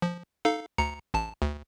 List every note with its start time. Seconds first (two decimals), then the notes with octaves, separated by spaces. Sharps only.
0.02 F3
0.45 D#4 A4 F5
0.78 D2 A#5 C#7
1.14 A1 A5
1.42 D2